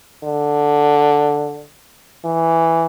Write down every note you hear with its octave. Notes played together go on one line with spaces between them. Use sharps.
D3
E3